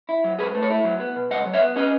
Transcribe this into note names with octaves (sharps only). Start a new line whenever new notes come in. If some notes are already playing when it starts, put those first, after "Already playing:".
E4
F#3
G#2 G#4 B4
A3
A4 C#5
E4
F#3
B3
B2
C#2 D#5 F#5
F#3
C#5 E5
B3
C#4 B4 D#5